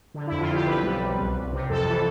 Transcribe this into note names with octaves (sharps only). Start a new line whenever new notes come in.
D3
F2 E4
F4
F2 G4
B1 B4
G3
B1
C2
C2
C3
F2 A4
E3